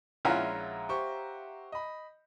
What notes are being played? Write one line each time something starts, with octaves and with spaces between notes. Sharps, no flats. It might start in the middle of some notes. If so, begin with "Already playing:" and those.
A#1 G#3 C#4 E4 F4 E5 F#5 A#5
G4 C5 C#6
D#5 B5